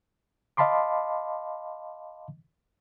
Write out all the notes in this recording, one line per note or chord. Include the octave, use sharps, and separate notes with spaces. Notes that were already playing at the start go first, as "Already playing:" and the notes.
D#5 F5 A5 B5 C6 D6